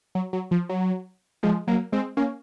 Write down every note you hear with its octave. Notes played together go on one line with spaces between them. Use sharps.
F#3
F#3
F3
F#3
F3 G#3
F#3 A#3
G#3 C4
A#3 C#4